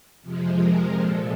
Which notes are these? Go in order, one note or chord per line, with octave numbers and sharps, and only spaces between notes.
F2 C3 F3 G#3
A#4
A#2 F3 G#3 A4